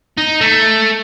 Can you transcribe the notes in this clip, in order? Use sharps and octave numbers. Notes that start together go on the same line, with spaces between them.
D#4
A3